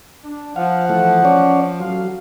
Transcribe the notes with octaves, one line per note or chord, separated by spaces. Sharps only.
D4
F3 F5 F#5
E3 A3
C#4 C#5 D5
A1 F#3 F5